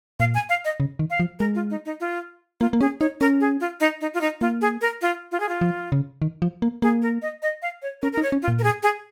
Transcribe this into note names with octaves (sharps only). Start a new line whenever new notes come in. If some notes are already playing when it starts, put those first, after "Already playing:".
A#2 F5
G#5
F5
D#5
C#3
D#3
F5
F3
G#3 A#4
F4
D#4
D#4
F4
A#3 F4
A#3
C#4 G#4
D#4 C#5
C#4 A#4
G#4
F4
D#4
D#4
F4
D#4
A#3 F4
G#4
A#4
F4
F4
G#4
F4
F3
C#3
D#3
F3
A#3
A#3 G#4
A#4
D#5
D#5
F5
C#5
C#4 A#4
A#4
D#4
C#5
C#4
F4
A#2
A#4
G#4
G#4